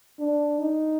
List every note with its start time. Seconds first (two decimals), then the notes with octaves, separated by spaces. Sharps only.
0.19 D4
0.59 D#4